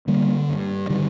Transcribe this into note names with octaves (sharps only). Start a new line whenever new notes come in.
D3 G3 A#3
G2
D3 D#3 G3